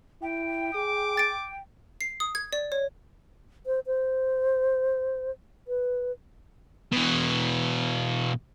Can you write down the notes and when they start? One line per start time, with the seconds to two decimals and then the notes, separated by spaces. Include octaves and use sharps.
0.22 E4 G5
0.75 G#4 D6
1.17 G5 A6 D7
2.01 C7
2.20 D#6
2.35 G#6
2.53 D5
2.72 C#5
3.67 C5
3.87 C5
5.68 B4
6.92 B2 E3